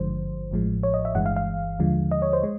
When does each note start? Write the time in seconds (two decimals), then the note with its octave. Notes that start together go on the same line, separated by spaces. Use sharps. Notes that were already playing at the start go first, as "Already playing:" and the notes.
Already playing: G#1 G2 D3 F3 G#3 C5
0.51 A1 A2 F3 G#3
0.83 C#5
0.94 D#5
1.05 E5
1.15 G1 G2 E3 G#3 F#5
1.26 F5
1.36 F5
1.79 D#2 D3 F3 G#3
2.11 D#5
2.22 C#5
2.33 C5
2.43 G#3